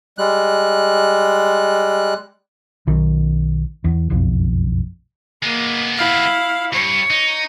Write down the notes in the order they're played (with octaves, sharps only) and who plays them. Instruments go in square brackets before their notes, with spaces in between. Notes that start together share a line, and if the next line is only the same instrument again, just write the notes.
[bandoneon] G3 G#3 F#6
[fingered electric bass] B1 D#3
E2
F#1 B1 F2
[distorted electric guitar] G#3 B3 [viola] A#3
[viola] E4 F5
[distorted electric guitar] G2 [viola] C#5
[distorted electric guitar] D#4